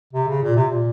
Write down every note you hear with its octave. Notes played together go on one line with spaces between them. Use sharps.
C3
C#3
A#2
C3
A#2